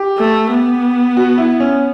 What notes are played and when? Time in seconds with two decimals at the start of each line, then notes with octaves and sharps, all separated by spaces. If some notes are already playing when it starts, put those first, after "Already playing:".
Already playing: G4
0.18 A3
0.51 B3
1.17 F#4
1.38 E4
1.60 C#4